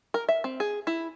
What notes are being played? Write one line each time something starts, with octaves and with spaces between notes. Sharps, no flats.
A#4
E5
C4
G#4
E4